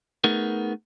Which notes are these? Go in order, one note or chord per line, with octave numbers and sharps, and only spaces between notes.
A3 B3 D#4 G#4 A#4